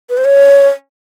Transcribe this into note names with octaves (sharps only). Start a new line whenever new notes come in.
B4
C5
C#5